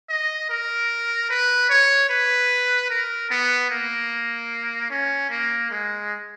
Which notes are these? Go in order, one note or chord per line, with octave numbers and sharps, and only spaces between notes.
D#5
A#4
B4
C#5
B4
A#4
B3
A#3
C#4
A#3
G#3